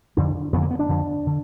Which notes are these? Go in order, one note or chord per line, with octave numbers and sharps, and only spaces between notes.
F2 D3 D4
F2 D3 B3
A#3
B3
D4
F2 D3
D3